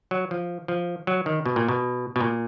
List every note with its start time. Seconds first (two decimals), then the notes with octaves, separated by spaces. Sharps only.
0.11 F#3
0.31 F3
0.68 F3
1.07 F#3
1.26 D#3
1.45 B2
1.56 A#2
1.68 B2
2.16 B2
2.21 A#2